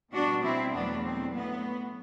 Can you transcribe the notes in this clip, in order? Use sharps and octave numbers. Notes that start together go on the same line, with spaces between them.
B2 G3 B3 D4 F#4
C4 E4
E2 B2 F#3 A3 B3 D4
C4
A2 F#3 A3 B3